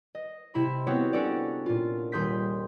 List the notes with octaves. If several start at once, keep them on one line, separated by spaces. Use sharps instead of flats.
D#5
C3 E4 B5 C6
B3 C4 F#4 G4 C#5
C#4 D4 F#4 A4 D5
A#2 F4
D#1 G#4 C6 G6 B6